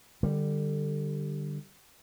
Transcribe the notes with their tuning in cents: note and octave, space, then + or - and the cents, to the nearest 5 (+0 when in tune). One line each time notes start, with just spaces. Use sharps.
D3 +20 G3 +0